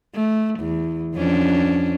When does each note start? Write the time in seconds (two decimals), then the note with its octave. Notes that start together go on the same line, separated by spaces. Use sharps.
0.15 A3
0.60 E2
1.15 F2 C#4 D4